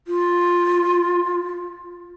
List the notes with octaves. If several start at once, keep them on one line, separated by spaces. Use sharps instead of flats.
F4